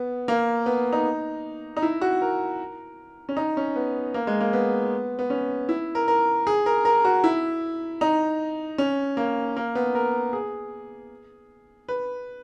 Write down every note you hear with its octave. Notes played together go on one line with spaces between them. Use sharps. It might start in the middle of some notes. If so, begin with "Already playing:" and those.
Already playing: B3
A#3
B3
D#4
D#4
E4
F#4
A#4
C#4
D#4
C#4
B3
A#3
G#3
A#3
B3
B3
C#4
E4
A#4
A#4
G#4
A#4
A#4
F#4
E4
D#4
C#4
A#3
A#3
B3
A#4
G#4
B4